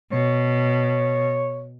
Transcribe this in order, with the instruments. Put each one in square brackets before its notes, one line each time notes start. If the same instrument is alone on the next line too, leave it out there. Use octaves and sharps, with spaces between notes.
[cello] B2 [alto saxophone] C#5